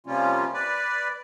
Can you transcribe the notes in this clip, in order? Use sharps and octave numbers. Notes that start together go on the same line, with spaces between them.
C3 F3 G3 A#3 C#4 F4
B4 D5